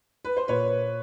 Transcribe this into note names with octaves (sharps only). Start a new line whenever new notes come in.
B4
C5
A#2 B4 C#5